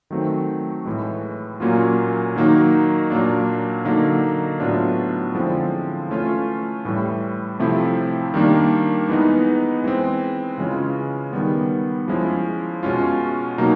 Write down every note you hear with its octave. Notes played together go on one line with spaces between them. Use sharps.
D#3 F#3 A3 C4
A2 E3 G#3
A#2 F#3 A#3 C#4 F4
D#3 F#3 A#3 D#4
A#2 F#3 A#3 D4
D3 F#3 A#3 D#4
A2 F#3 B3 D4 F4
D3 F3 G#3 C4 E4
E3 A3 C#4 F4
A2 E3 G3
C3 F3 A3 C4 E4
D#3 G3 A#3 D4
E3 G#3 B3 D#4
E3 G#3 C4
C#3 E3 G#3 C#4 F4
D#3 G3 B3
F3 G#3 C#4 E4
B2 G#3 C#4 F4
B2 F#3 A#3 D#4